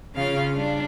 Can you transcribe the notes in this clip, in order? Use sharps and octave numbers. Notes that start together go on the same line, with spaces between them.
C#3 C#4 F4 F5
G3 D4